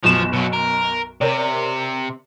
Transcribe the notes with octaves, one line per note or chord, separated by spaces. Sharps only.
B1 F#2 F3 E7
B2 F#3
A#4
C3 A#4 C#5 D5